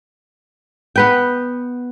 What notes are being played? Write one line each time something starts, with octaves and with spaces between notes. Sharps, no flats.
B3 B4 G5